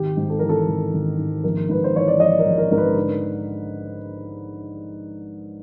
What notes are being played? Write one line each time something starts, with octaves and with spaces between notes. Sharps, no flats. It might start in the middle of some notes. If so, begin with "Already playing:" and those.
Already playing: G#1 G4
G#2
A4
E3 A#4
A4
G#1
G#1
G#2
A#1 A#4
G#2 B4
C5
E3 C#5
D5
A#1 D#5
A#4
A#1
A#4
G#2 A#4
B4
D3